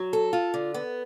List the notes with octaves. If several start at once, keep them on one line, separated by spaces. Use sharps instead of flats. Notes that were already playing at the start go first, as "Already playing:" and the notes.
Already playing: F#3
A4
F4
D3
B3